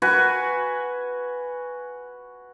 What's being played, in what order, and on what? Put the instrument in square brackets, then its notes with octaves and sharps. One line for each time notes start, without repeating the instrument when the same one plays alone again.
[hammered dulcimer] F#4 B4 G#5